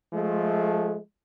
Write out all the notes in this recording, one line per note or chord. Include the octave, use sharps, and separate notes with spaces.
F3 G#3 A3